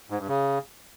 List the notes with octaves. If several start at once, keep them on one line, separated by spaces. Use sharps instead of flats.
G#2
G2
C#3